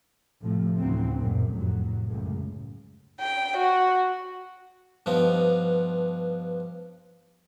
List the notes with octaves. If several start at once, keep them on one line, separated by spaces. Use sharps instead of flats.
A2 C3 F3 A3
D2 A2 C#3 E3 F#3 C4
F#2 A#2
F1 A2 F#3
C#2 F#2 A2
G5
F#4
G2 F3 B3 D#4